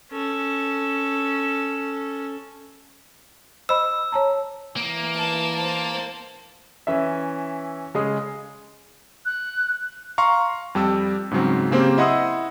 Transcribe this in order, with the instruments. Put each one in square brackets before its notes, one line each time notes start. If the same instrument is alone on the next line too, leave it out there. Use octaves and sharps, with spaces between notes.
[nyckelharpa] C#4 A4
[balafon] C5 D#5 B5 [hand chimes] E6
[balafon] C#5 A5 A#5
[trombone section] E3 [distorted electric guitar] A#3
[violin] A5
C5 A5
[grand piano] E3 C#4 E5
C#3 G#3 D#6
[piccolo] F#6
[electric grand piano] F5 A#5 C6 C#6
F2 G3 G5 E6
G#2 C#3 F#3 C4
C#3 A#3 C4 G4 C5
E4 D#5 F#5 C6 D#6 E6